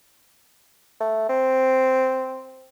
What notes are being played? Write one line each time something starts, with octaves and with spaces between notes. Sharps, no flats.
A3
C4